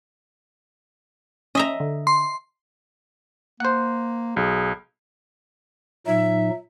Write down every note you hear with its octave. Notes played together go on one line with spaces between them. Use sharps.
C#4 D#5 E5 A#5
D3
C6
A#3 C5 F#5
B1 G#4
A#2 F#3 D#4 E5